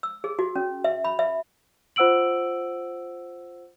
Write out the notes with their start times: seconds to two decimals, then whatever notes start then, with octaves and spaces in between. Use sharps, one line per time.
0.03 E6
0.24 G#4
0.39 F#4
0.56 C#4
0.84 E5
1.04 B5
1.19 E5
1.96 F4 C5 F#5 E6 D7 F#7